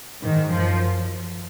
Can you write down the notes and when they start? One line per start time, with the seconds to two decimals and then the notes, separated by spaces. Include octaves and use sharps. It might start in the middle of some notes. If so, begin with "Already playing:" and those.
0.21 G#2 D#3
0.49 F#2 F3